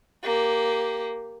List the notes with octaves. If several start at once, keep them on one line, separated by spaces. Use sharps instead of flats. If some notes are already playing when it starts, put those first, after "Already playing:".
A#3 G4